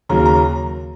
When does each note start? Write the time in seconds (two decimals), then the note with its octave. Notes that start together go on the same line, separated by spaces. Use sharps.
0.09 D#2 C#3 F#3 A#5
0.26 A#5